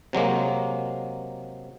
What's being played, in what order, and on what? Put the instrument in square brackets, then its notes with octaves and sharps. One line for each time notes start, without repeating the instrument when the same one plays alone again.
[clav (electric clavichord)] C3 F#3 G#3 A#3